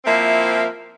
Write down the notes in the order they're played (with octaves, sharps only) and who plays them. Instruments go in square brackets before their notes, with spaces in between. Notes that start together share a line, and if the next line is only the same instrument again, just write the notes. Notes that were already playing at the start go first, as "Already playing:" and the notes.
[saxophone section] F3 A#3 C4 E4 A#4 E5